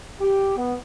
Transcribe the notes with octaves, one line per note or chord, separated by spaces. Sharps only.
G4
B3